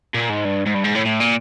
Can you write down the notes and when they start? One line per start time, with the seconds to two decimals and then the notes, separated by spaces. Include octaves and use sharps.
0.14 A#2
0.29 G#2
0.45 G2
0.66 G#2
0.74 G2
0.84 G#2
0.95 A2
1.05 A2
1.20 A#2